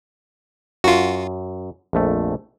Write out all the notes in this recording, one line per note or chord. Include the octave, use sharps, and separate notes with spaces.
F#2 F4 F#4
A#1 F2 A3